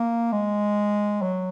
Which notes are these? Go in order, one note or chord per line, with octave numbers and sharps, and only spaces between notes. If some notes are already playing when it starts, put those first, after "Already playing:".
Already playing: A#3
G#3
F#3